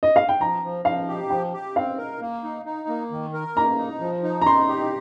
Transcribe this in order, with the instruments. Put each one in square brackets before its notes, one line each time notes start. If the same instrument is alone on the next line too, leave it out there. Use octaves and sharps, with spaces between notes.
[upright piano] D#5
F5
G5
[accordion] F3 [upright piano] A#5
[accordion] F3
[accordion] F3 [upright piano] F5
[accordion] G4
[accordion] F3 [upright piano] G5
[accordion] G4
[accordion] C4 [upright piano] F5
[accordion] A#4
A#3
D#4
D#4
A#3
D#3
A#4
[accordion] A#3 [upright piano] A#5
[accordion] D#4
F3
D#4
[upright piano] A#5
[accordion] D#4 [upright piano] C6
[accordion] G4